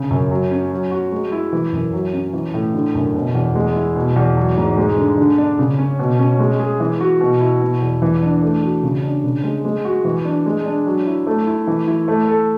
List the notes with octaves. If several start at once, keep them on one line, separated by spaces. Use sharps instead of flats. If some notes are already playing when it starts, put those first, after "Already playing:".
Already playing: C#3
F#2
F#3
C#4
F#3
F#4
G#3
E4
E3
F#2
F#3
C#4
E3
A2
D3
F#2
B2
E2
G#3
E4
B2
E2
F#3
G#2
G#3
D3
D3
D4
C#3
C#4
B2
C#4
G#3
G#4
E3
F#4
B2
E4
B2
E2
E3
D4
A3
F#4
C#3
D4
C#3
G#3
G#3
F#4
E3
D4
G#3
D4
F#3
E4
A3
E4
E3
E4
A3
A4